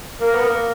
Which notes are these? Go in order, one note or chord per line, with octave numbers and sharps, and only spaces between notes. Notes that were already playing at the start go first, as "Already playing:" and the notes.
A#3 A#4
B3
A#3